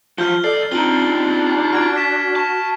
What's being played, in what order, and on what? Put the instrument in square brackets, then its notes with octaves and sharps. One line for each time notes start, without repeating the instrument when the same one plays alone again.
[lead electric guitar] F3 [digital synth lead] F4 [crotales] F6 G6 G7
[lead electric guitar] B1 D5 [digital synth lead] A4 [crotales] C7
[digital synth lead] C4 [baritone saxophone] D4 [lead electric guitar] D#4 F4 [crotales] D7 F#7 G7
[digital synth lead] F#4 [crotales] F6 G#6 D7
[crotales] B6 E7
[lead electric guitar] A5 [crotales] C#6